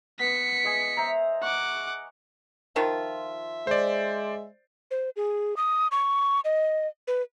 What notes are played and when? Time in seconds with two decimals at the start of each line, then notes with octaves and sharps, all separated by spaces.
0.19 B3 B6 C#7
0.64 G#3 D#5 G#5
0.97 C5 E5 A#5
1.43 F#5 C#6 D6
2.76 D#3 F3 F4 E5
3.67 G#3 C5 D5
4.91 C5
5.16 G#4
5.57 D#6
5.92 C#6
6.45 D#5
7.08 B4